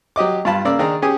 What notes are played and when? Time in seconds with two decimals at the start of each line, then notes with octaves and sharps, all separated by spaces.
0.16 F#3 G4 D#5 D6
0.45 G2 F4 A5 B5
0.65 C#3 A#3 D5 E6
0.79 D#3 D4 G#4 A#5
1.02 C#4 G4 G#4 G#5 D#6